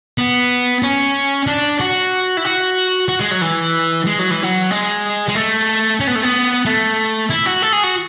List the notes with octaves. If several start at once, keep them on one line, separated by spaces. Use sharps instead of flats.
B3
C#4
D4
F#4
E4
F#4
F#4
G#3
F#3
E3
G#3
F#3
E3
F#3
G#3
G#3
A3
C#4
B3
A3
B3
A3
E4
F#4
A4
G#4
F#4